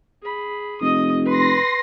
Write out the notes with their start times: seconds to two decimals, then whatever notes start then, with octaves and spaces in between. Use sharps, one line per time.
0.22 G#4 B5
0.81 F1 D#5 D#6
1.25 B4 C6 A#6